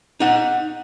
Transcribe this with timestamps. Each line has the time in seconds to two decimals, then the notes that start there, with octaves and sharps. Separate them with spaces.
0.20 D#4 F#5